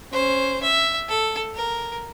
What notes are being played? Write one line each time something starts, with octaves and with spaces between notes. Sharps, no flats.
C#4 C5
E5
A4
A#4